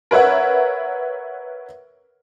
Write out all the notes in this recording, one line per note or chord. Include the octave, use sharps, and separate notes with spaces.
A#4 B4 C#5 E5 F#5